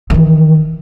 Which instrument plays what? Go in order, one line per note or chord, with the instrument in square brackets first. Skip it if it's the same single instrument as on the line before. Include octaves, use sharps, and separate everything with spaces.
[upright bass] D#3 E3